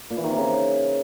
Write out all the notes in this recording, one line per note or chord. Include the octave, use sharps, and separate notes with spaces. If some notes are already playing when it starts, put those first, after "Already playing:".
A#2
E3
D#3
C3
C#3